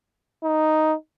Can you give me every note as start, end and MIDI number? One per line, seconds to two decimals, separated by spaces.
0.44 0.94 63